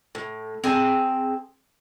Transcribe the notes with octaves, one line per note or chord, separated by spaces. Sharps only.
A2
C4 G#4 G#5 A5